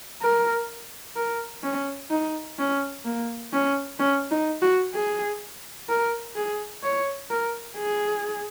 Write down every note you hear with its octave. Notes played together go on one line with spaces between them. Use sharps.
A#4
A#4
C#4
D#4
C#4
A#3
C#4
C#4
D#4
F#4
G#4
A#4
G#4
C#5
A#4
G#4